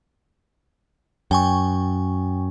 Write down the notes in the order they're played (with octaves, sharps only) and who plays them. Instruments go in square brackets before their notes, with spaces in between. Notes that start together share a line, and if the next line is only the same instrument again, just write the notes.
[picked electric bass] F#2 [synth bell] G5 G#5 C#6